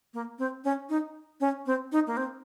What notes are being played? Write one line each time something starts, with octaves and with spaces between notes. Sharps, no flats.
A#3
C4
C#4
D#4
C#4
C4
D#4
A#3
C4